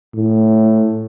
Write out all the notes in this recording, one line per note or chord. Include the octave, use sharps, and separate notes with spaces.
A2